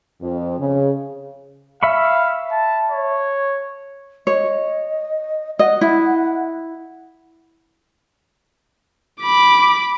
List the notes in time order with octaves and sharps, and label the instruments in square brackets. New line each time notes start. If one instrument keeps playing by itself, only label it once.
[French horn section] F2
C#3
[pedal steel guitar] E5 B5 C#6 [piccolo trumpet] F5
[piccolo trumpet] A5
C#5
[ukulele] C#5 [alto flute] D#5
[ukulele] D#5 [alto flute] F#5
[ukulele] E4
[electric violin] B5 D6